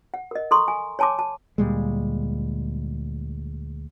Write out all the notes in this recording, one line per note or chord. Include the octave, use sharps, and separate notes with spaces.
F#5
A#4 D#5
A4 A#5 C6 C#6
G#5
C#5 G#5 A5 C6 D6
A5
D2 A#2 G3 G#3